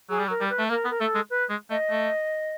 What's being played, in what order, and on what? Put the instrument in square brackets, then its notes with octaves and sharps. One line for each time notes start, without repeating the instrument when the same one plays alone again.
[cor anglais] F#3 [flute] G#4
[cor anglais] G3
[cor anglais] F#3 [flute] A#4
[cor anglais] G3
[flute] B4
[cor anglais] A3
[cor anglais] A#3 [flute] A#4
[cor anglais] B3
[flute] A#4
[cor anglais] A3 [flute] A4
[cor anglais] G#3
[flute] B4
[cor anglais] G#3
[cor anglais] A3 [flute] D#5
[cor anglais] A3